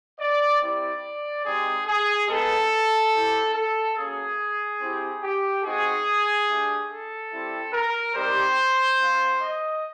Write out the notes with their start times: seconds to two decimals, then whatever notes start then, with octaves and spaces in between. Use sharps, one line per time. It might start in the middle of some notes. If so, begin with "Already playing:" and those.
0.20 D5
0.61 C4 E4 G4 D5
1.45 G#3 C4 D#4 G4 G#4
1.87 G#4
2.29 G#3 B3 D#4 A4
3.13 C4 E4 G4
3.55 A4
3.96 A#3 C#4 F#4 G#4
4.81 C4 E4 G4
5.22 G4
5.63 C4 D#4 F#4 G#4
6.48 A3 D4 G4
6.89 A4
7.31 G3 C4 E4
7.73 A#4
8.15 G3 C4 D#4 G4 C5
8.99 C4 F4
9.41 D#5